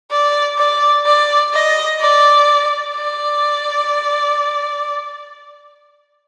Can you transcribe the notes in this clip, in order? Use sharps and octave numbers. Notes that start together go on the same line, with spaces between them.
D5
D5
D5
D#5
D5
D5